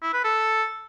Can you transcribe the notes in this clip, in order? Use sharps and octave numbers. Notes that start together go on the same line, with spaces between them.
E4
B4
A4